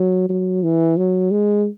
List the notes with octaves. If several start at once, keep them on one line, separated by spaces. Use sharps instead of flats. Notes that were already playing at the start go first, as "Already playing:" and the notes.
Already playing: F#3
F#3
E3
F#3
G#3